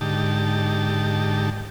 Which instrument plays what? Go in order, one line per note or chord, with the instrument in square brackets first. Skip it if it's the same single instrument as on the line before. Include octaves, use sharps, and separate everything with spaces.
[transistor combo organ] G#2 D3 D#4 G4 A5